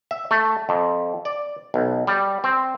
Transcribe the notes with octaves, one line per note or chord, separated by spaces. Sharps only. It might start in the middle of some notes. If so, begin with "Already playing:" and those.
E5
A3
F2
D5
B1
G3
C4